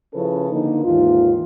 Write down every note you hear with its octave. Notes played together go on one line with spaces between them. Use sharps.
C#3 F3 C#4 E4 A4 B4
D3 A#3 D#4
D#2 G#2 E3 F4